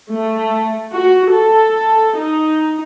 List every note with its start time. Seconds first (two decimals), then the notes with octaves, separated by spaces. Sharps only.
0.11 A3
0.93 F#4
1.33 A4
2.17 D#4